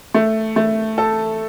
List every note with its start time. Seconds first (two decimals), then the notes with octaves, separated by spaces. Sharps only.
0.14 A3
0.56 A3
0.98 A4